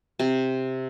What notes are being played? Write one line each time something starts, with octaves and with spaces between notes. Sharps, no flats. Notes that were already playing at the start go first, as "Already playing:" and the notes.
C3